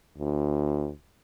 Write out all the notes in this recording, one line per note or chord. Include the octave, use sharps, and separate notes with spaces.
D2